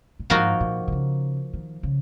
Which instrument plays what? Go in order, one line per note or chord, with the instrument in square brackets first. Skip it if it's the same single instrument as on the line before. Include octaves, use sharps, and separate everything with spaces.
[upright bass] A#2
[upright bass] G#2 [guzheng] F3 A#3 D#4 F#4 A#4
[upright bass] A#2
B2
C#3
D#3
C#3